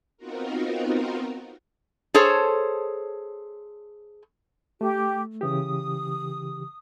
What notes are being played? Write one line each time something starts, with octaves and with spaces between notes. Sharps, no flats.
B3 C4 D#4 F4 F#4 A#4
G#4 A4 C5 C#5
A3 G4
C#3 E3 G4 D#6